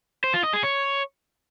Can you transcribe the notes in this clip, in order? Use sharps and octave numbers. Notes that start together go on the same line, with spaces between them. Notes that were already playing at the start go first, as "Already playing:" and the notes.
C5
F4
D#5
G#4
C#5